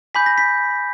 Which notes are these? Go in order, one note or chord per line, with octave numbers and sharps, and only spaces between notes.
G#5 B5 D6 G6 B6
A#6
B6